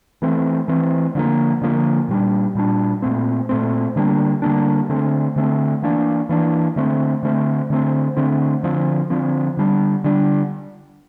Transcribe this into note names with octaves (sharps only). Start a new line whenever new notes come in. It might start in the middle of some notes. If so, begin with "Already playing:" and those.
E3 A3 C4
E3 A3 C4
D3 F3 A#3
D3 F3 A#3
A#2 G3 D4
A#2 G3 D4
A#2 A3 C4
A#2 A3 C4
D3 G3 A#3 D4
D3 G3 A#3 D4
D3 A3 C4
D3 A3 C4
E3 A#3 D4
E3 A#3 D4
D3 A3 C4
D3 A3 C4
D3 A3 C4
D3 A3 C4
D3 F3 C4
D3 F3 C4
D3 G3 D4
D3 G3 D4